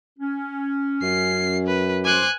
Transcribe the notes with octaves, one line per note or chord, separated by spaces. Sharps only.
C#4
F#2 C7
B4
C5 G#5 C6 D6 F#6